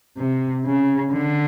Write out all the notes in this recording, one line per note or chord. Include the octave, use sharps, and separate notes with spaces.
C3
C#3
D3